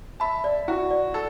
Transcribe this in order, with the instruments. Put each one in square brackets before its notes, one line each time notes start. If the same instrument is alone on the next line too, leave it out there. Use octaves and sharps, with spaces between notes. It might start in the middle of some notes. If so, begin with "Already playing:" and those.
[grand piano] E5 A5 [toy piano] B5
[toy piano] D5
[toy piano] E4 [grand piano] F#4
[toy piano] D5
[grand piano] A4